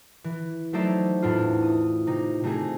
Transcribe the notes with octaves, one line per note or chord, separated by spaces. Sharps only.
E3
F#3 A3 D#4 C5 D5 E5
E2 A2 D4 E4 F4
D#6
C3 D#4
C3 A3 D#4 G#4